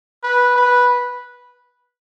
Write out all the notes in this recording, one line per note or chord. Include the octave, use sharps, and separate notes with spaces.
B4
B4